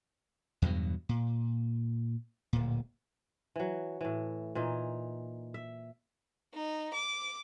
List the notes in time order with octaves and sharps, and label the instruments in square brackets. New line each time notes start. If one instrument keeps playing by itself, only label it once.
[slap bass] E2 G2 B2 F#3
A#2
D1 A#2
[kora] E3 F#3
A2 E3
A#2 E3 D#4
E5
[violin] D#4
D6